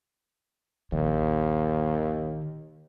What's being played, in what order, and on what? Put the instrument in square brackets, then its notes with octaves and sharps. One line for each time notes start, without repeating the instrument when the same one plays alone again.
[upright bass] A#1 D#3 [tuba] D#2